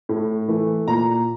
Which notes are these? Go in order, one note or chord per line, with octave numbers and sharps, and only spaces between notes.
A2
E3 A3
A#2 A#5